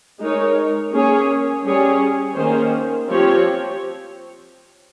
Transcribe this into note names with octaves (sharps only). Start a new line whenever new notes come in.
G#3 D#4 A#4 C#5
A#3 C#4 G#4 C#5
G3 C#4 G#4 C#5
D#3 A#3 C#4 G#4 C5
F3 C4 G4 C#5